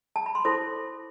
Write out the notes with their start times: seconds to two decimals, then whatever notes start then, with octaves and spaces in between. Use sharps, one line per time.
0.16 A5
0.26 B5
0.35 C6
0.45 E4 A4 C5 D6